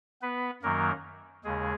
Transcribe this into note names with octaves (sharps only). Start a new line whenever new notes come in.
B3 B4
F#2 D#3 F#3 A#3 A#4
D#2 C#3 G#3 G#4